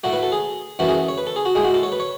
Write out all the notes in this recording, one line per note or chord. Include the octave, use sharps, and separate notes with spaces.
A2 F#3 A3 F#4
B4
A4
G#4
F#2 E3 A3 F#4
G#4
C#5
B4
A4
G#4
F#4
A2 G#3 G#4
F#4
A4
C#5
B4
C#5